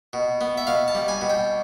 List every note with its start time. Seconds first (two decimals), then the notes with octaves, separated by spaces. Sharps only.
0.13 B2
0.41 B3
0.58 E5
0.67 B2 F5
0.88 A5
0.95 G3
1.08 G#5
1.22 B2
1.30 G5